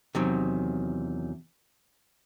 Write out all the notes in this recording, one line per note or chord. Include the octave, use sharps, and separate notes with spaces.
E2 C3 D#3 F#3